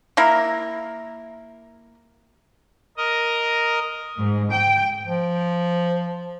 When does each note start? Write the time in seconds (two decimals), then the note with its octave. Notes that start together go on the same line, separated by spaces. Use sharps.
0.17 A#3 E4 A#4
2.97 A#4 D#5
4.18 G#2
4.52 G5
5.07 F3